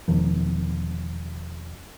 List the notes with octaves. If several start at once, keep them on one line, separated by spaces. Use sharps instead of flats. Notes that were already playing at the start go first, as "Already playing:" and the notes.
E1 E2 D#3 F3